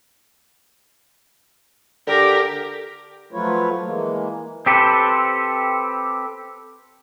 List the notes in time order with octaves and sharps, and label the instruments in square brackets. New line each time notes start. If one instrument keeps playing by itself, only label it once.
[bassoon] D3 [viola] G4 A#4
[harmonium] F3 F#3 A3 F4 B4 C#5
E3 G#3 A#3
[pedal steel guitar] C4 G4 A4 B4 C5